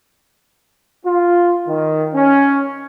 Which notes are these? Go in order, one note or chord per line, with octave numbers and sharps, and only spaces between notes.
F4
D#3
C#4